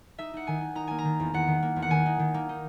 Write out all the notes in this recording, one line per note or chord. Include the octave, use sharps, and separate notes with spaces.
D#4 E5
D#4 F#5
D#3 G#5
D#4
D#4 A#5
A#3 G#5
A#5
D#3
E2
E2 F#5
D#3
A#3
E2
F#5
D#3 G#5
D#4
D#3
A#3
D#4